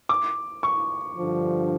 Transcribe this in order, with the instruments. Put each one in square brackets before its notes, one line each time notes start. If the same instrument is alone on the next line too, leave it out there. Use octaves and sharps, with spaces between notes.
[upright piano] D6
C#6
[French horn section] G2 D3 F3